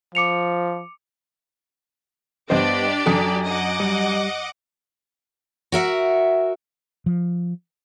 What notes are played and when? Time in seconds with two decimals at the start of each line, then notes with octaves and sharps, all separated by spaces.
0.15 F3 D6 C#7 F7
2.50 G2 B3 D4 G4 C5 D5 D#5
3.06 F#2 A4 D#6 B6
3.45 D#5 F#5 D6
3.80 G3
5.72 F#4 A#4 E5 F#5
7.06 F3